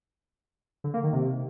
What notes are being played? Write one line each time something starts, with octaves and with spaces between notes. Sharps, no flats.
D3
A#3
D#3
C3